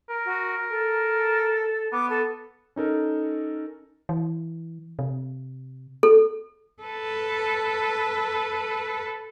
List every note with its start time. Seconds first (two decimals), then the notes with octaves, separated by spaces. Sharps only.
0.09 A#4
0.25 F#4
0.70 A4
1.92 B3 D6
2.10 A4
2.76 C#4 D#4 A4 A#4
4.09 E3
4.99 C3
6.03 A4
6.82 A4 B4